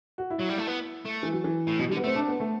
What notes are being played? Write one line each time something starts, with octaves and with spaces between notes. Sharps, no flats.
F#4
E4
F#3
G3
A3
B3
A3
E3
F#3
E3
A2
B2 F#3
D3 G3
B3
A3 C4
D4
B3
A3